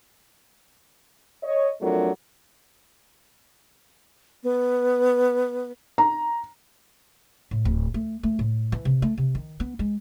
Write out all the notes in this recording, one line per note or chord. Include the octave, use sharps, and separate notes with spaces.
C#5 D#5
F2 F#3 A3 D4 F4 A#4
B3
A#5
A2
D1
A3
A3
A2
E3
C3
A3
C3
D#3
B3
G#3